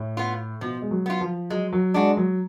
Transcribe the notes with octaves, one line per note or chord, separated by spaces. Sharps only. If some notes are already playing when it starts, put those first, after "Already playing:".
Already playing: A2
B3 F4
B2 F3
G#3
F#3
B3 F4
F3
F#3 G#3
F#3
G#3 D4 F#4
F#3